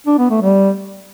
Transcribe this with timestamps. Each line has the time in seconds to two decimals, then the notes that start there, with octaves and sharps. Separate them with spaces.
0.07 D4
0.18 B3
0.30 A3
0.42 G3